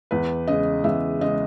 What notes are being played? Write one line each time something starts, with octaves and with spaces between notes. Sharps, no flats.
E2 B4
C#3 G#3 D#5
E2 E5
C#3 G#3 D#5